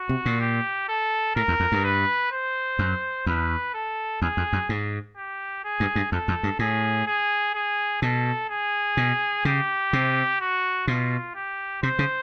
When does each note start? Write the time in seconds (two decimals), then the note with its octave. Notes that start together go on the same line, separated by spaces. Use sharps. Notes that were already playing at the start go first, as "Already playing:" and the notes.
Already playing: F#4
0.09 C3
0.26 A#2
0.40 G4
0.88 A4
1.35 A2 A#4
1.48 E2
1.60 F2
1.72 G2
1.84 B4
2.32 C5
2.79 F#2
3.26 E2 B4
3.74 A4
4.22 E2 G#4
4.37 F2
4.53 F#2
4.69 G#2
5.17 G4
5.64 G#4
5.80 G2
5.95 G2
6.12 F2 A4
6.28 F2
6.43 G2
6.59 A2 G#4
7.07 G#4
7.54 G#4
8.02 B2 A4
8.49 G#4
8.97 B2
9.45 C#3 G4
9.93 C3
10.40 F#4
10.87 B2 F4
11.35 G4
11.82 C3 C5
11.99 C#3